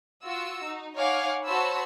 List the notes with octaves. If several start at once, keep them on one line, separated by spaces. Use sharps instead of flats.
F4 F#4 E6
D#4
D#4 C#5 F5 F#5 G#5 D6
F#4 C5 C#5 A5 B5 E6